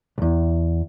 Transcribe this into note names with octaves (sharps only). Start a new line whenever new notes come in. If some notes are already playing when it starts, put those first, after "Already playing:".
B1 E2